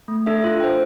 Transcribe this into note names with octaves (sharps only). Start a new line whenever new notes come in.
A3
D4 A4 E5
F4
C5 G5